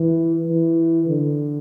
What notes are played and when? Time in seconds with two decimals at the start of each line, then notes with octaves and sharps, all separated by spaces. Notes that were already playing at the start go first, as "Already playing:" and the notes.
Already playing: E3
0.46 E3
1.08 D3